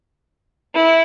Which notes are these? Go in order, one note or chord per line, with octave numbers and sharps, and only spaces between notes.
E4